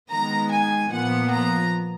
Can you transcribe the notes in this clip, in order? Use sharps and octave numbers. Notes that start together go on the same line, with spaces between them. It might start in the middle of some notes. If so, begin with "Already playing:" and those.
D#3 G#3 B3 A#5
G#5
A#2 F3 B3 F#5
A#5